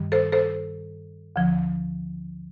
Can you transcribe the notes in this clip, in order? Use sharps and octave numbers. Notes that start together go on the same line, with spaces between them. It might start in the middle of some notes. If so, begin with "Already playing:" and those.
Already playing: G2 D#3 G3
A4 C5
A4 C5
D2 D3 F3